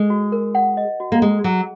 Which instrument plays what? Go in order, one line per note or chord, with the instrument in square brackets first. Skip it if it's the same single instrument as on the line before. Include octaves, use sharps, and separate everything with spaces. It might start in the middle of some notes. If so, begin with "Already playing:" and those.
Already playing: [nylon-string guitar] G#3
[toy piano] F#4
A#4
F#5
D#5
F#4
[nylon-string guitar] A#3
[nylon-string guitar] G#3 [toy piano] A#5
[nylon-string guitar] F#3 [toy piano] G#4